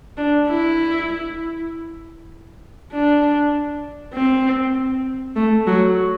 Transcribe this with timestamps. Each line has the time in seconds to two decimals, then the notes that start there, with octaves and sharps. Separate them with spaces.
0.17 D4
0.48 E4
2.92 D4
4.14 C4
5.36 A3
5.67 F#3